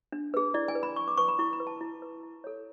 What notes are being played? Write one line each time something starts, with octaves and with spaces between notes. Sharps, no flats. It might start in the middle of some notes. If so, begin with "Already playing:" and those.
D4
G#4 B4
E4 D5
G#5
B4
B5
E4 C#6
D6
B4 C#6
B5
E4 C#6
B5
B4
A5
E4
B4
E4
A4 C#5